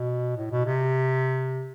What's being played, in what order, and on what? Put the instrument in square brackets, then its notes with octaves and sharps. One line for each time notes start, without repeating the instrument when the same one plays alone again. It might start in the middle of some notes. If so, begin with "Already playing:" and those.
Already playing: [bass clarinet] B2
A2
B2
C3